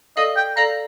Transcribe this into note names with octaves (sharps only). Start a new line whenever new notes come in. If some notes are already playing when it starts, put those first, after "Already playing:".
A4 D5 D#5 F5
G5
A4 D5 F5 A#5